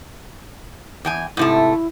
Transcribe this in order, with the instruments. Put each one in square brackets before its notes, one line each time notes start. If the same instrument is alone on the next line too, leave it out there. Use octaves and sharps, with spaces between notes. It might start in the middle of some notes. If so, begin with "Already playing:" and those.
[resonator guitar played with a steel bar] E2 G5 G#5
[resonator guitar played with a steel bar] G#2 C3 A3 [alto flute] E4